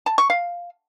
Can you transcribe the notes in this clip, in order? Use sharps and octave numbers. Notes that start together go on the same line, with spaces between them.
A5
C#6
F5